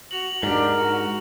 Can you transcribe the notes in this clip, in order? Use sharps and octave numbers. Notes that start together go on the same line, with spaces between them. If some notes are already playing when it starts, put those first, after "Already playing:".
F#4 F7 F#7
G#2 D4 G4 A#4
F#4